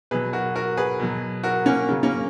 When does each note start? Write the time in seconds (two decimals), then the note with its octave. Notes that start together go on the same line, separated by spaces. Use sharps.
0.11 B2 F#3 G#4 B4
0.33 F#4 A#4
0.56 F#4 A#4
0.77 G#4 B4
1.00 B2 F#3
1.44 F#4 A#4
1.66 A#3 C#4
1.89 C#3 F#3
2.03 A#3 C#4